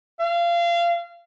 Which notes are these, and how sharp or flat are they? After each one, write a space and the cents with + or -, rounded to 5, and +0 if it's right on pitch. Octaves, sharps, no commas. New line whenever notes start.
F5 -25